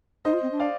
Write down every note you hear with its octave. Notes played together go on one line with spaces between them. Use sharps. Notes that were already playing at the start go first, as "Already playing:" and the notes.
D#4 C5 D#5
F4
C4
D4
D5 F5